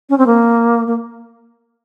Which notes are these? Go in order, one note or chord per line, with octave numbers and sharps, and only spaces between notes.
C#4
C4
A#3
A#3